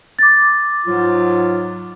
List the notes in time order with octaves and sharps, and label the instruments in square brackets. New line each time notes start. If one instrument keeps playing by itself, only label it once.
[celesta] D6 A6
[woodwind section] G#2 F#3 F4